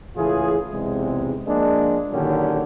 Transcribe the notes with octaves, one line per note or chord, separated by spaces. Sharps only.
C#2 A2 E3 F4 G#4
B1 E2 C3 G#3
F3 G#3 A#3 D4
A#2 D3 D#3 F#3 C#4 G4